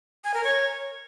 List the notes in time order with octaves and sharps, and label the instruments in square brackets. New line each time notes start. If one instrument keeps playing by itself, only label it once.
[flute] G#5
A#4
C#5